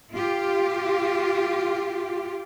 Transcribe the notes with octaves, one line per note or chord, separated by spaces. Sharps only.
F4 G4